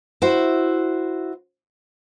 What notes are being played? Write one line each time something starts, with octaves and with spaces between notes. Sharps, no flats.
E4 F#4 C5